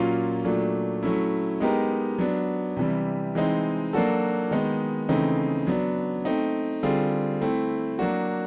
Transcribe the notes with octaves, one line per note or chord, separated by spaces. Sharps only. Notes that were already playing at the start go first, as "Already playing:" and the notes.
Already playing: A#2 F#3 A#3 C#4 F4
A#2 F#3 A3 D4
F#3 A3 C#4 E4
G#3 B3 D#4 G4 A#4
F#3 B3 D4
C3 E3 G3
E3 G#3 C4 D#4
F#3 A#3 D4 F#4 A4
D#3 G#3 B3 D#4
C#3 E3 A3 C4 D#4
F#3 B3 D4
A3 C4 D#4
D3 G3 C4 F4 G#4
A3 C4 E4
F#3 A#3 D4 F#4